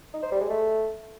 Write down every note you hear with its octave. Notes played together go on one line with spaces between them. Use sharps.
D#4
C5
G3
G#3
A3